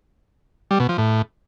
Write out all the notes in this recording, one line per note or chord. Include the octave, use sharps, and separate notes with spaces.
G3
B2
F3
A2